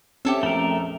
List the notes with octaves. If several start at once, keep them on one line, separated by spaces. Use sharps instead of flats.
C4 C#4 G4 A4 E5
A#1 F2 A3 A#4